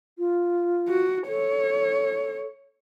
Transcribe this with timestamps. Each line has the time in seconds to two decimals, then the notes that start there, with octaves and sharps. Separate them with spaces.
0.18 F4
0.88 F#4
1.28 A4 C#5